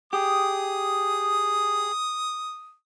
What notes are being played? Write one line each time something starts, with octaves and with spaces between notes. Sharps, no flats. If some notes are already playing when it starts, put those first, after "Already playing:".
G4 G#4 D#6